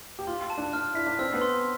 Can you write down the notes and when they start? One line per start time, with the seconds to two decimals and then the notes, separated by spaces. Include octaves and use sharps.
0.19 G4
0.27 F4 C6
0.50 A5
0.58 D4
0.73 D4 F6
0.95 E4 B6
1.07 D4
1.19 C4 E6
1.34 B3
1.41 C6